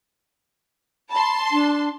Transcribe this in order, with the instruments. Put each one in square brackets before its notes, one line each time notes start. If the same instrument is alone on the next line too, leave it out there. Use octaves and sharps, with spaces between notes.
[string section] A5 C6 [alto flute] B5
[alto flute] D4